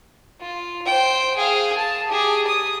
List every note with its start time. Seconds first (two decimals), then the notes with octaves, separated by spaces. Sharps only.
0.41 F4
0.86 C5 G5
1.36 G#4 F5
1.78 A5
2.07 G4 G#4
2.47 D#6